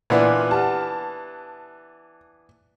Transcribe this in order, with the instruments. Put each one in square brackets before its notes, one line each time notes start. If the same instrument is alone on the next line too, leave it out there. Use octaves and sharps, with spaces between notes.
[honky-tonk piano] A#2 [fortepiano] E3 B3 D4 [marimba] B4 D5 E5
[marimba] G4 F#5 F6 [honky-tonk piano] A5